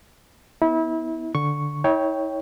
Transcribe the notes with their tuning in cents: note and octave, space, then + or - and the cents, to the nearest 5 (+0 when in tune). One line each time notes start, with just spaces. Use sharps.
B3 +0 E4 -30
D3 +0 C#6 +0
E4 -45 C#5 +5 G5 +0